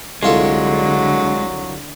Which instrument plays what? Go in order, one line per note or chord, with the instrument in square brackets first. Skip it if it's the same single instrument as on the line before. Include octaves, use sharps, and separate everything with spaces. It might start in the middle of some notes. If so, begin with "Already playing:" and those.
[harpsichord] C2 F4 A4 [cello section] D3 [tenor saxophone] F#3 [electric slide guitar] G#3